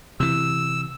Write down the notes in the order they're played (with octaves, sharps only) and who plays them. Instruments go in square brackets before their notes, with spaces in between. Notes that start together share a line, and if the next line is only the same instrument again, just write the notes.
[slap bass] C3 E3 [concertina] E6